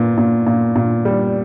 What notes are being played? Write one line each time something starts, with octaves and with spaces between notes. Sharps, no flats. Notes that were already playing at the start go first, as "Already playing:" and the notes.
Already playing: A#2 B3
A#2
A#2
A#2
G3